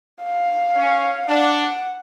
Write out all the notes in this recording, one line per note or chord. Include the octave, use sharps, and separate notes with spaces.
F5
C#4
D4 F#5